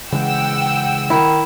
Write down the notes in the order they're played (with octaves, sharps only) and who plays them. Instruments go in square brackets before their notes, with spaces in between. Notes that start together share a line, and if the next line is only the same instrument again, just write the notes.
[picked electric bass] C#3 E3 G#3 [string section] F#5 G5 E6
[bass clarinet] D#3 [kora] E4